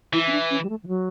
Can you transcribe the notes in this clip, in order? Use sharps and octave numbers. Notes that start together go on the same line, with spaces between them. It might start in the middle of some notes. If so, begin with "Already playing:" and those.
E3 E4
C#4
D4
C#4
G3
A3
E3
F#3